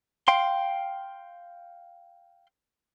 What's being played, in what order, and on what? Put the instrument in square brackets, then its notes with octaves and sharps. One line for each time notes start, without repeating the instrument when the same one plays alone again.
[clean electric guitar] F5 G5 C6